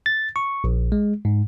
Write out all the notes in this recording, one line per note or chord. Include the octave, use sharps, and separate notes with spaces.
A6
C#6
A#1
G#3
G#2